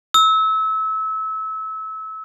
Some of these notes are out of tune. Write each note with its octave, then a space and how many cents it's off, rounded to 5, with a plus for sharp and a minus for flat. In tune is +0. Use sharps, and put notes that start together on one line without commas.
E6 -25